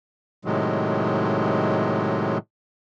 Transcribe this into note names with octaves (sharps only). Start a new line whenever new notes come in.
A2 C3 D#3 F#3 G#3